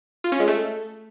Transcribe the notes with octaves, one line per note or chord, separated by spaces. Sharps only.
F4
C#4
G#3
A3